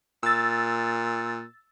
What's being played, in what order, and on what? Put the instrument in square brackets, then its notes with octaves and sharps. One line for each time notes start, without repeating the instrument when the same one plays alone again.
[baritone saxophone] A#2 [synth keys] E6 A6